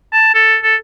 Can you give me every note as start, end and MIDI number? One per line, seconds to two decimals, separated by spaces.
0.13 0.31 81
0.34 0.57 69
0.63 0.75 69